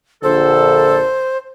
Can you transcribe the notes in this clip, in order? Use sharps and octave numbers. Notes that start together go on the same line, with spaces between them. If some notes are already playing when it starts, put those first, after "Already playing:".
A#1 D3 A4 C5